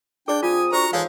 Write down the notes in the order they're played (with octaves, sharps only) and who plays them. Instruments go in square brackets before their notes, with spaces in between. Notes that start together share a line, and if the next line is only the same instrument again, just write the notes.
[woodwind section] D4 [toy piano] G#4 D5 [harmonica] G5
[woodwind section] F3 C4 D#6 [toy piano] F4 [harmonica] G#5
[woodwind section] D3 F#4 [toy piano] C5 [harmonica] A#5 C#6
[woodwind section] G#2 E3 [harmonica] G#3 G#4 A4 [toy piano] C#5 F5